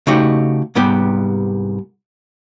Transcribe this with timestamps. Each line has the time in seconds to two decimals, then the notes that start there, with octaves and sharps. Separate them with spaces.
0.07 C#3 A3 D#4 F#4 G4
0.75 C2 G#2 G3 B3 G4